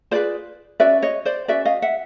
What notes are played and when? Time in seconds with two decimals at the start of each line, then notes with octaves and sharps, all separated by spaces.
0.11 F4 G#4 B4 C5 D5
0.80 C#4 F#4 B4 D5 E5
1.02 C#5 D#5
1.25 C5 D5
1.48 C#4 F#4 B4 D5 E5
1.65 D#5 F5
1.82 E5 F#5